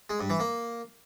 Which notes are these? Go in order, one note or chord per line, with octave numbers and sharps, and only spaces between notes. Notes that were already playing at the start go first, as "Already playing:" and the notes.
G#3
G2
E3
A#3